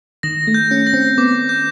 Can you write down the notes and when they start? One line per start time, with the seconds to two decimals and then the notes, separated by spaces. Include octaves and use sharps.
0.23 D#3 A#6
0.47 A3
0.54 G6
0.71 C#4
0.87 A#6
0.94 C4
1.18 B3 D6
1.49 G6